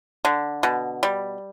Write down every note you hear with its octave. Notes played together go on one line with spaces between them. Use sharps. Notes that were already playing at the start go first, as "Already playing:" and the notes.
D3
B2
G3